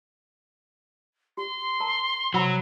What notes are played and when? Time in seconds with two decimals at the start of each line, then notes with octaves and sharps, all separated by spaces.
1.37 G4 C6
1.80 A#4 A5 A#5
2.34 C3 F#3 F#5 A#5 B5